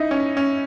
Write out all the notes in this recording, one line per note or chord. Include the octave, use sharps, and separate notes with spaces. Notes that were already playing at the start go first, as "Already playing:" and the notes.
Already playing: D#4 E4
C#4
C#4